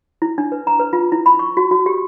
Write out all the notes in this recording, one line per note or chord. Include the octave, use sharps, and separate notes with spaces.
E4
D4
B4
A#5
B4
F4
E4
B5
C#6
F#4
F#4
G4